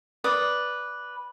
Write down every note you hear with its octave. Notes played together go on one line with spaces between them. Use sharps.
B4 D5 D#6